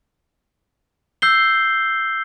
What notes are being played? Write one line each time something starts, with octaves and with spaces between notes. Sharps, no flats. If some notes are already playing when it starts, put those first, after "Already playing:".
E6 G6 C7 G7